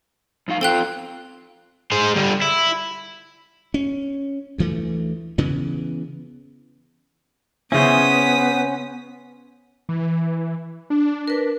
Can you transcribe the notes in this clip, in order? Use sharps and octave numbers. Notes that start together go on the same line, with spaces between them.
F2 D#4 F5
C4 F4 A4 G5 F#6
G#3 C5
G2 D3
E4
C#4
D2 E3 A3
C#3 E3 B3
C#3 B3 C#4 E4 C5 D#6 B6
E3
D4
A#4 B4